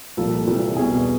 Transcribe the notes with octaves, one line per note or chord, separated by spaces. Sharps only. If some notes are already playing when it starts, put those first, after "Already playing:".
C2 A#2 F3 A4
C2 C3 E3
E2 B2 G#4